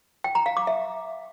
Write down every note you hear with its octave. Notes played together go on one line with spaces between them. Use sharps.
G5
A#5
F5
D6
E5